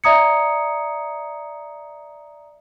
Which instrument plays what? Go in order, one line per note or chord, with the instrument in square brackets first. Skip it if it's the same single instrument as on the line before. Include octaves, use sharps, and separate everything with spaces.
[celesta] D5 E5 A#5 D#6 G#6 C#7